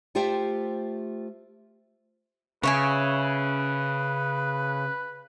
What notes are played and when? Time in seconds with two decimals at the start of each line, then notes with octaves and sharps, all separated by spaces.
0.15 A3 F4 G4 C5 E5 G5
2.63 C#3 B4 C#5 E5 G#5